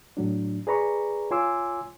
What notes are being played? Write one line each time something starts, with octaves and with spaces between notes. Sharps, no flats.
A2 F#3 D4
G#4 B4 D5 A#5 B5 C#6
F4 C#5 G#5 C6 D6 E6